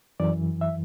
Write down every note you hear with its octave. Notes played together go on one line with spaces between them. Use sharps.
F#2 E3 D5
E5